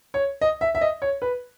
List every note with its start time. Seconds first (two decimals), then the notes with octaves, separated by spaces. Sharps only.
0.14 C#5
0.41 D#5
0.61 E5
0.75 E5
0.81 D#5
1.02 C#5
1.22 B4